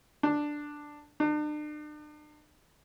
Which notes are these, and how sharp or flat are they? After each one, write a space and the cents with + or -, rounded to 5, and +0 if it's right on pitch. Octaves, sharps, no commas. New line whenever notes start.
D4 +5
D4 +40